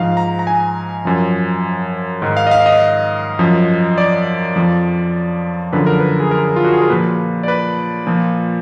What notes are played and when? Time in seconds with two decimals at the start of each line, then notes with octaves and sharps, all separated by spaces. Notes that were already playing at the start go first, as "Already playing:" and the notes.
Already playing: G#2 F3 F5
0.17 A#5
0.39 A#5
0.47 G#5
1.05 F#2 F3
2.22 G#2 D#3
2.37 F5
2.47 D#5
2.51 F5
2.66 D#5
3.39 F#2 F3
3.98 D5
4.56 F2 F3
5.73 F#2 D3 F3 B4
5.86 A#4
6.00 B4
6.20 G#4
6.31 A#4
6.56 F4
6.65 F#4
6.73 G#4
6.82 A#4
6.90 A#2 F3 B4
7.43 D5
7.48 B4
8.07 A#2 F3